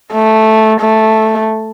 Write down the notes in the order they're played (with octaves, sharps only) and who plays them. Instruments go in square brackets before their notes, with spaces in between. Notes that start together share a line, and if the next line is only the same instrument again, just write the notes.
[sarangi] A3
A3